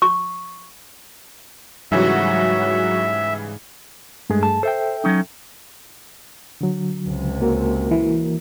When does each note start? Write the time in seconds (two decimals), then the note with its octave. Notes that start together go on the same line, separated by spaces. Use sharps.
0.02 C#6
1.92 G#2 C#3 E3 F#3 G3 F#4 E5
4.30 G2 G#3 A3 G#4
4.43 A5
4.63 A4 C5 E5 G5
5.04 F#3 C#4 D#4
6.61 D3 F#3
7.06 C#2 C3
7.41 A#3 F#4 A#4
7.91 E3